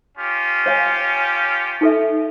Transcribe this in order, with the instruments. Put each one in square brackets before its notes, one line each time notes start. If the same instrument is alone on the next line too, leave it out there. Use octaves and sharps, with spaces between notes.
[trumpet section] C#4 F4 G4
[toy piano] C#5 F5 G#5
D#4 A4 E5